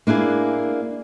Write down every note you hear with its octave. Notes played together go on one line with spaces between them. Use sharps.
A#3 D4 E4 G#4